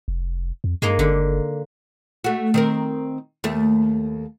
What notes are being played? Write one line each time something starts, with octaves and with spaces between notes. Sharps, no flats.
F1
F2
G2 G#3 A#3 D#4
G1 D3
A3 F#4
D#3 C4 A#4
D#2 A3